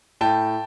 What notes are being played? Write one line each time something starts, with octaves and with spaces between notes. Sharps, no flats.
A2 G5 A5